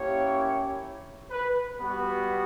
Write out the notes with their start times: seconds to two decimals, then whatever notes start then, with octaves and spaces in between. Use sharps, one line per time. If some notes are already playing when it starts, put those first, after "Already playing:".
Already playing: A#3 C#4 E4 G4 C#5
1.31 B4
1.78 G3 B3 F#4 B4